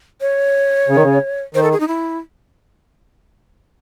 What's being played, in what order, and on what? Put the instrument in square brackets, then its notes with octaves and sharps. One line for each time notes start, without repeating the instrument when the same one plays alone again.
[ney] C#5
[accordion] C#3
D#3
C#3
[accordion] D#3 [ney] C5
[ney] A4
G#4
D#4
E4